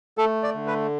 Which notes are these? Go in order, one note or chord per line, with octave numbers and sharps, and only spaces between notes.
A3 A4
D5
D3
B4